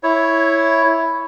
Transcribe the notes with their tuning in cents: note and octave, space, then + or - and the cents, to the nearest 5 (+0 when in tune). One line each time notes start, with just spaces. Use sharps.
E4 +0 C#5 +0